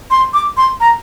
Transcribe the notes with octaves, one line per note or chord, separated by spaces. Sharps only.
C6
D6
C6
A#5